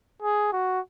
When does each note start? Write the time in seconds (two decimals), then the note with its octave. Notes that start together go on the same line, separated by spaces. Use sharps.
0.22 G#4
0.53 F#4